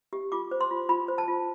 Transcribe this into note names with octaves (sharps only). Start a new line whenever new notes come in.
G4
F4 D6
C5
C6
F4
F4 B5
C5
A5
F4